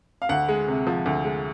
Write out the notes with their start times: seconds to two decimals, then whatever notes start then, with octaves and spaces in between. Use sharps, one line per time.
0.22 F5
0.29 D2 F#5
0.48 G#3
0.68 C3
0.87 F3
1.06 D2
1.24 G#3